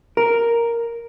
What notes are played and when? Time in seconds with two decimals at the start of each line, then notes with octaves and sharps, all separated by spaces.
0.17 A#4